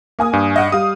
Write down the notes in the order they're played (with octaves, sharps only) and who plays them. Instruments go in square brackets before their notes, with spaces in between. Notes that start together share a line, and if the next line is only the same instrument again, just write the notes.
[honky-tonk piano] A#3 G#5 D#6
[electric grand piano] G2
[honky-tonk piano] D#5 F#5
[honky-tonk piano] G3 [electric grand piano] F5 D#6